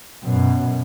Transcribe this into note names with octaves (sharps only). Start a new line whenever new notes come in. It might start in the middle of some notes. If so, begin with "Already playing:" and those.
F#2 B2